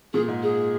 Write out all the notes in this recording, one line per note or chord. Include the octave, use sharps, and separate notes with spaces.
A#2 G#4
G#2
G#4